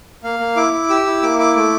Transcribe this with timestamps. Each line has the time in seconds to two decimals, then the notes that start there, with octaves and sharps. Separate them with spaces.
0.24 A#3 F5
0.40 A#3
0.56 E4 D6
0.73 E4
0.90 G4 E6
1.06 E4
1.22 A#3 D6
1.38 E4 D6
1.56 A3 D6